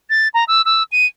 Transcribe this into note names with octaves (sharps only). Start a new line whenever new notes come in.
A6
A#5
E6
E6
D#7